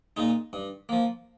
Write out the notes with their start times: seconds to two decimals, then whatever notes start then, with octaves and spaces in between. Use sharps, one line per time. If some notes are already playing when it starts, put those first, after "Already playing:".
0.17 A#2 G#3 D#4
0.53 G2
0.89 F3 A#3